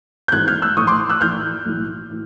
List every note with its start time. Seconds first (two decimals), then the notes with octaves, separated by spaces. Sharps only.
0.28 G6
0.32 G#1 G#2 E3 F#6 G#6
0.48 F6 G6
0.62 E6 F#6
0.77 A#1 A2 E3 C#6 D#6
0.87 C6 D6
1.09 E6 F#6
1.21 A#1 A2 E3 F6 G6
1.66 B1 A2 E3
2.10 A2 E3